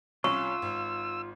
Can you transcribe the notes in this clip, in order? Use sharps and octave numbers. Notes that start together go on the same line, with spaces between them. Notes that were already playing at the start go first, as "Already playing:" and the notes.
C2 C#4 F4 C#6 E6
G#1